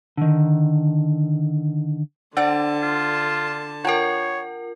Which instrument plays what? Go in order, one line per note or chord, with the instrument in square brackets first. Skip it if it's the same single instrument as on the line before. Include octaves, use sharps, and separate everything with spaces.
[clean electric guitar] D3 D#3
[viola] D3 A5 [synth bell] D4 [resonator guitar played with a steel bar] C5 D5 F#5
[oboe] F4
[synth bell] F4 A#4 [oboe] C#5 [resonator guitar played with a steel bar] F#5 G5